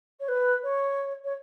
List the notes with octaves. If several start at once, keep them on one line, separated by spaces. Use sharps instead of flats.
C#5
B4
C#5
C#5